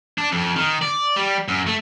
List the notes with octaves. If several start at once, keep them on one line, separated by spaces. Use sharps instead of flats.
D4
F2
D#3
D5
G3
F#2
A3